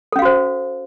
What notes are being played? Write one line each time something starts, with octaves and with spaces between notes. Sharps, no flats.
C#4 F#4 A4 C5 F5